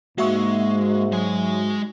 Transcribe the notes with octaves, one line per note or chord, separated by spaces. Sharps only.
G#2 G#3 A#3 F#4 E5 C#6
F#3 G#3 G#5